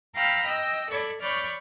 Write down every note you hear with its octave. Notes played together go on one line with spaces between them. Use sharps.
F5 G5 A#5 B5 E6 F6
D#5 G5 E6
A4 D5 B5 G#6
C#5 D5 B5 C#6 F6 G6